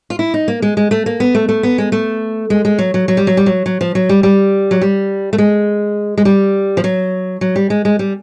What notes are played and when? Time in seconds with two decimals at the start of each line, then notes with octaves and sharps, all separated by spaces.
0.10 F4
0.19 E4
0.34 D#4
0.48 A#3
0.62 G#3
0.77 G#3
0.91 A3
1.06 A#3
1.20 B3
1.35 A3
1.48 A3
1.63 B3
1.78 G#3
1.92 A3
2.50 G#3
2.65 G#3
2.79 F#3
2.94 F#3
3.08 F#3
3.17 G3
3.27 F#3
3.37 G3
3.46 F#3
3.66 F#3
3.81 F3
3.95 F#3
4.09 G3
4.23 G3
4.71 F#3
4.81 G3
5.33 A3
5.38 G#3
6.18 G#3
6.25 G3
6.77 F3
6.84 F#3
7.41 F#3
7.56 G3
7.70 G#3
7.85 G#3
7.99 G3